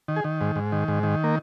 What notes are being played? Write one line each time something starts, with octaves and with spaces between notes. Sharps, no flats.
D#3
G#4
D#3
G#2
G#2
D#3
G#2
D#3
A#3